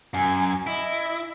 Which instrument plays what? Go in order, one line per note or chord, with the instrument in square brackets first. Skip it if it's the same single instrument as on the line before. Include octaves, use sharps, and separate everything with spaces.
[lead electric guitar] F#2 [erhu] G#5
[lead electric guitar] E4 [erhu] D#5